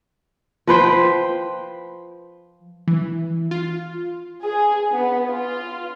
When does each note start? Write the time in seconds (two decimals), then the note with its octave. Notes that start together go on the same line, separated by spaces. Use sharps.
0.67 F3 B4 C5 G5
2.88 E3
3.51 F4
4.43 G#4
4.93 B3
5.29 F4